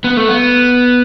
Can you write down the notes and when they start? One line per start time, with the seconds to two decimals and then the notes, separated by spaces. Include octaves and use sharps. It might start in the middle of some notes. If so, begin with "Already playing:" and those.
0.04 B3
0.17 A3
0.29 B3